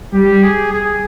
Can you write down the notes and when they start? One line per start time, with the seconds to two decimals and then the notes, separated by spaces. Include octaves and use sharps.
0.13 G3 G4
0.43 G#4
0.71 G#4